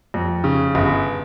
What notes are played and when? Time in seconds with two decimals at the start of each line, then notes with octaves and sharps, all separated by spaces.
0.14 F2
0.44 C#3
0.75 G1